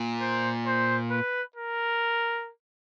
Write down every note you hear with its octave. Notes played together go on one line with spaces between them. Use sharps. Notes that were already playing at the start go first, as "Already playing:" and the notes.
Already playing: A#2
C5
C5
B4
A#4